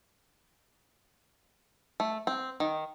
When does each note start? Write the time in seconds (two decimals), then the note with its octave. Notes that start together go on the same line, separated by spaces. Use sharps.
2.00 A3
2.27 C4
2.60 D#3